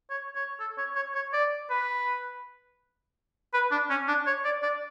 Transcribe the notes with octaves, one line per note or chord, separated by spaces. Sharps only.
C#5
C#5
A4
C#5
C#5
C#5
D5
B4
B4
D4
C#4
D4
C#5
D5
D5